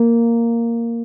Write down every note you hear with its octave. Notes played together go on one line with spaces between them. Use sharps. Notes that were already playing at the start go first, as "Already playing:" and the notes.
Already playing: A#3